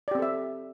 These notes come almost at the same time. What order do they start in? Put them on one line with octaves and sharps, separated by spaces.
D5 G4 C4 A4 E5